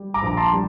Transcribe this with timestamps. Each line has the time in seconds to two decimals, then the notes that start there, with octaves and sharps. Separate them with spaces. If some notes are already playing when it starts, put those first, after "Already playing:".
Already playing: G3
0.14 A#5 D6
0.22 A#1
0.27 A#5
0.37 A5 C6
0.53 G3